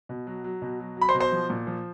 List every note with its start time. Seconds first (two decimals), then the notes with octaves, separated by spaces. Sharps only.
0.09 B2
0.27 F#3
0.44 F#3
0.62 B2
0.80 F#3
0.97 F#3 B5
1.09 C5 C6
1.15 B2
1.20 C5 C6
1.32 F3
1.50 A#2
1.67 F3